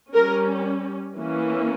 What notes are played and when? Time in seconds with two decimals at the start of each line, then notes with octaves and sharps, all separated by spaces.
0.14 G3 C#4 A#4
1.15 E3 A#3 C#4